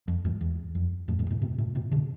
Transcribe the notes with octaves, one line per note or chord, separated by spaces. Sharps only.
F2
E2 G#2
E2
F2
F2 A2
F2 A2
G#2 B2
A2 C3
A2 C3
A2 C3
B2 D3